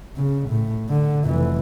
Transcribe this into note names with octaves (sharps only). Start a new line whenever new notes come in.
C#3
A2
D3
F1 E3